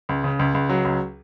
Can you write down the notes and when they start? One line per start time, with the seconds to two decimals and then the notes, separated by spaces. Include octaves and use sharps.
0.09 C#2
0.24 C#3
0.39 C#2
0.54 C#2
0.69 F#3
0.85 C#2